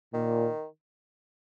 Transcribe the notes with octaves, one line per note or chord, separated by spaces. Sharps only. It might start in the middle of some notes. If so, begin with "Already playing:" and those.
A#2 D#3